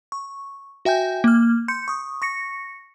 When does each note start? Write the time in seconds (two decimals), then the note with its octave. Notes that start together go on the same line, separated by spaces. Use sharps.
0.12 C#6
0.85 F#4 E5 G5 G#5 G6
1.24 A#3 F6
1.68 C6 G6 C#7
1.88 C#6 D#6
2.22 C#6 A#6 C#7